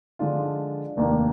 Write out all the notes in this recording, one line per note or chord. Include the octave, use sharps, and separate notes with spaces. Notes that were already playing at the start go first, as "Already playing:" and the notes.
D3 F3 G#3 D4 F4
F1 D#2 D#3 A#3 D4